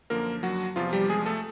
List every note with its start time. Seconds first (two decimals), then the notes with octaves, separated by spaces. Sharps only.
0.10 F#2 D3 F3 A#3 A#4
0.43 F#3 F#4
0.76 E2 C3 F3 F4
0.93 G3 G4
1.09 G#3 G#4
1.26 A3 A4